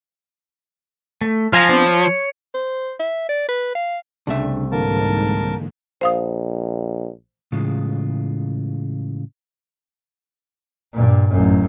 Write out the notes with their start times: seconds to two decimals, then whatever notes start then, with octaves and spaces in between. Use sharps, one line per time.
1.21 A3
1.53 F3 F5 G#5 A#5
1.69 B3 C4 D4
1.86 C#5
2.55 C5
2.99 E5
3.29 D5
3.49 B4
3.75 F5
4.27 C2 C#3 A3 D4 E5
4.72 G#2 D3 E3 A#3 A#4 A5
6.01 A#1 C5 F5 D#6
7.52 A2 C#3 E3 G#3 F4
10.93 G2 A#2
11.30 A1 F#2